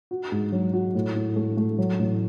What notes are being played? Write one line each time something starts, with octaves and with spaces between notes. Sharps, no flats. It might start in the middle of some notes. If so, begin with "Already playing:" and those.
F#4
G#2
F#3
F#4
A2
A2
A3
A3
F#3
A1